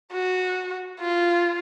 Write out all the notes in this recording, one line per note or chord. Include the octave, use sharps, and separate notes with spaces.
F#4
F4